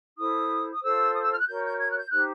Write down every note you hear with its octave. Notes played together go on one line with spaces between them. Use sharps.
E4 A4 C5 D#6
D#6
F4 A4 C5 E6
D#6
E6
F6
F#6
F#4 A#4 C#5 G6
G6
G#6
F#6
G6
D#4 G4 C5 F#6